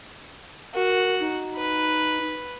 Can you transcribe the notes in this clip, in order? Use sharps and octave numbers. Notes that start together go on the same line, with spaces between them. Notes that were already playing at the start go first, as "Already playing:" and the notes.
F#4 A#4
D#4
B4